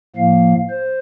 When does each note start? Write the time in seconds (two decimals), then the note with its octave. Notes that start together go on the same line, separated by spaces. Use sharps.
0.16 A2 F3 A#3 F5
0.70 C5